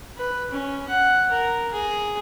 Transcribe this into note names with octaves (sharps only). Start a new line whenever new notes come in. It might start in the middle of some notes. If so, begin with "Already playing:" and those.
B4
C#4
F#5
A#4
G#4